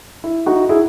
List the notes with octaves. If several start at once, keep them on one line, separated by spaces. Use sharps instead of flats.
E4
D#4 F#4
E4 G#4